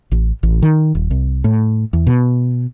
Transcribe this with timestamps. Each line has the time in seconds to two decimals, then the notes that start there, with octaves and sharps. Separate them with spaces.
0.12 A1
0.43 A1
0.62 D#3
0.95 D#1
1.11 C2
1.44 A2
1.93 E2
2.07 B2